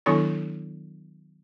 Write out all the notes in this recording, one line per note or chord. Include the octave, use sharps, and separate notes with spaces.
D#3 F#3 B3 D4 E4 A4